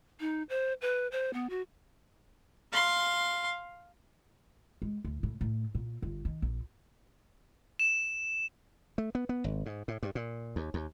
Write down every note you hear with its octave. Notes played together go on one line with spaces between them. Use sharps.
D#4
C5
B4
C5
B3
F#4
F5 C6
G#3
D2
A2
A2
A#2
G1
D#3
A#1
E7
A3
B3
B3
G#1
G#2
A2
G2
A#2
D#2
D#2